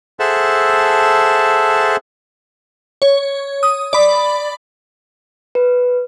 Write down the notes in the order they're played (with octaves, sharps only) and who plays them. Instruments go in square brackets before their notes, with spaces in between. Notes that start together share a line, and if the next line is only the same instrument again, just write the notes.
[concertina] G#4 A4 C5 E5 F#5 A5
[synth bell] C#5
D#6
D5 B5
[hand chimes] B4